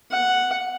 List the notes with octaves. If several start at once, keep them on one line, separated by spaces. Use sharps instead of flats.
F#5